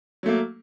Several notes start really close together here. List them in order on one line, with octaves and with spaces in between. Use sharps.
F#3 A3 A#3